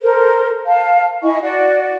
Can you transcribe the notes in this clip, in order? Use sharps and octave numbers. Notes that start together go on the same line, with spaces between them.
A4 A#4 C5
F5 A5
E4 D#5 G#5 C#6
F#4 D5